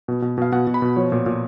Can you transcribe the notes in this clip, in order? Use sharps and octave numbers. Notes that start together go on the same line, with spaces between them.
B2
B2
B2 F5
B2 F#5
B2
B5
B2
F3 C#5
A#2
A#2